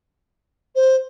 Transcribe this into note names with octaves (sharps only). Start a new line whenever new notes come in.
C5